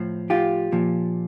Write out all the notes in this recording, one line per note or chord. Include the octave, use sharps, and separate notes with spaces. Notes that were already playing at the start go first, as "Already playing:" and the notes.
Already playing: A2 F3
F4 G4
A#2 F3